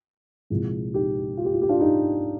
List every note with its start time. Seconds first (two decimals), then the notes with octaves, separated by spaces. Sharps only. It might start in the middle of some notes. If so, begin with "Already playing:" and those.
0.50 C2 A#2 F3 G#3
0.94 D#4 G4
1.37 F4
1.45 G4
1.54 F4
1.62 G4
1.69 D4 F4
1.80 D#4 G4